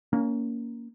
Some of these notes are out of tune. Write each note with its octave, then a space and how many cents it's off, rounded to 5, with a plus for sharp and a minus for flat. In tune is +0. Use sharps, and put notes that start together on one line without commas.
A#3 +0 C#4 +25